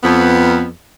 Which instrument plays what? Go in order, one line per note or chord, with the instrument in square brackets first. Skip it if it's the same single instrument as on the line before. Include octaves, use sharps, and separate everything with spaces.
[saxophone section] F2 B3